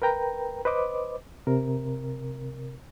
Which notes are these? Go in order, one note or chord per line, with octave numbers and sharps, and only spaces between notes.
A#4 B4 G5 A#5
B4 C5 D#5 D6
C3 A#4